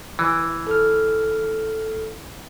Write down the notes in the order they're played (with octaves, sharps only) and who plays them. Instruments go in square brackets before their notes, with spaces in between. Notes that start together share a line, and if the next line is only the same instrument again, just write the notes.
[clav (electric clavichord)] E3
[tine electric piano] A4 F6